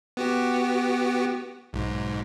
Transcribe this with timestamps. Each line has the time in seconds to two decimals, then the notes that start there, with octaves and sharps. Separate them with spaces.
0.17 B3 F#4 G4
1.73 B1 G#2